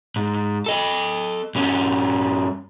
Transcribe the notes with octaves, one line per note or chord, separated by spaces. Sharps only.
G#2
A4 D#5
G2 C#4